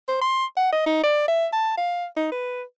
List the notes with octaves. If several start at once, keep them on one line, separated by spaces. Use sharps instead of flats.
C5
C6
F#5
D#5
D#4
D5
E5
A5
F5
D#4
B4